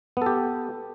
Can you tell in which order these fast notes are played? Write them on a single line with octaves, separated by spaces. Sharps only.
B3 A4 G4